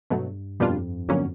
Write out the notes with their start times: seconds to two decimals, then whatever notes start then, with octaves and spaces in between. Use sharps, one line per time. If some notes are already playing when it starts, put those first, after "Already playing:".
0.10 G2 B2 F#3 A3
0.60 F2 B2 G3 A#3 D4 F4
1.09 F2 D3 F#3 A#3 C#4